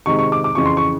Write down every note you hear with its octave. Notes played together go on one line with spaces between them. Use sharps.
C3 D#3 G#3 C#6
C#6
D6
D6
F2 C#3 E3 C#6
C6
C#6